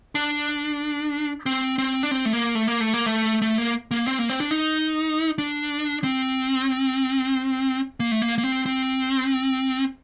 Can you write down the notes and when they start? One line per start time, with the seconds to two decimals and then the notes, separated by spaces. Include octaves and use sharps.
0.15 D4
1.46 C4
1.78 C4
2.03 D4
2.11 C4
2.25 A3
2.33 A#3
2.55 A3
2.68 A#3
2.81 A3
2.94 A#3
3.06 A3
3.42 A3
3.58 A#3
3.91 A#3
4.07 C4
4.19 A#3
4.30 C4
4.40 D4
4.51 D#4
5.38 D4
6.04 C4
8.00 A#3
8.11 A3
8.22 A#3
8.38 A#3
8.44 C4
8.66 C4